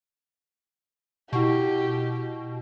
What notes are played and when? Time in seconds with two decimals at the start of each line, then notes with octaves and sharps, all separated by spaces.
1.33 B2 E4 G4 F#5 C#6